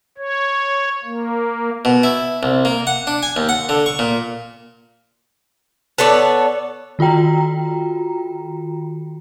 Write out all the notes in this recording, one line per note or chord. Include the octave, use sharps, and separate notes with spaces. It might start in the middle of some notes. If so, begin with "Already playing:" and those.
C#5
A#3
B2
E4
C2
A#3
F#5
D4
G#5
D#2
F#5
D3
C#6
A#2
B3 A4 C#5 D5
D#3 F4 F#4 G5 A#5